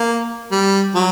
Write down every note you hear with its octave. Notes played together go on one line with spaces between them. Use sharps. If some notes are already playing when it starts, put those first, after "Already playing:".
Already playing: A#3
G3
F#3